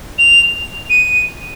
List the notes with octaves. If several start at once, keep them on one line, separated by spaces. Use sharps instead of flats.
F7
D#7